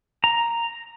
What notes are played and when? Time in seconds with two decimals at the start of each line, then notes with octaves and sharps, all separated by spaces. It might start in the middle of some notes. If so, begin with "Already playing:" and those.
0.24 A#5